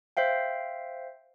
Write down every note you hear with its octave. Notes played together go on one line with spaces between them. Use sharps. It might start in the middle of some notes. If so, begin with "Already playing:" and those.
C5 E5 F5 G5